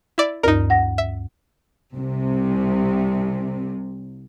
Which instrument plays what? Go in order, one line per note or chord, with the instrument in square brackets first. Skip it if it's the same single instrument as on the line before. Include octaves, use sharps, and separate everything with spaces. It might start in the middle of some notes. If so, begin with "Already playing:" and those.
[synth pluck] E4 D5
[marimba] D2 G2 [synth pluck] D#4 A#4
[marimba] F#5 A#6
[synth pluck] E5
[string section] C2 C3